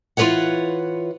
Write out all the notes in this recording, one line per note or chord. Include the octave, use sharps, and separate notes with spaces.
E3 F4 G#4 B4 C#5 F#5